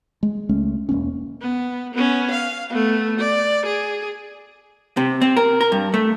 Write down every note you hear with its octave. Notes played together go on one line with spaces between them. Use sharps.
G#3
C#2 G#3 A3 C#4
E1 G#2 A#3 C#4
B3
B3 C#4
F5
A3 B3
D5
G#4
C3
C4
A#4
A#4
G2
A3